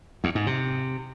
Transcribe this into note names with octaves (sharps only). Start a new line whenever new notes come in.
E2
G#2
C3